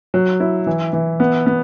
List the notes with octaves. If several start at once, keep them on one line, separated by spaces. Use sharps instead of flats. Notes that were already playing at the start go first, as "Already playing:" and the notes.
F#3
E4
E3
E3
B3
B3